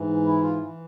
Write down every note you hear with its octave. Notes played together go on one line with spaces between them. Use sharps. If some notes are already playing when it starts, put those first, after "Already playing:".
Already playing: G#2 E3
E4
F4
E3